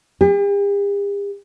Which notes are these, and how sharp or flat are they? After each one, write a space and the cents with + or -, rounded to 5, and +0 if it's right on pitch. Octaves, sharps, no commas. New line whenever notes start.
G4 +45